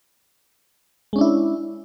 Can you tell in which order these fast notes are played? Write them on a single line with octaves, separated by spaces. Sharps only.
G#3 C#4 D4 E4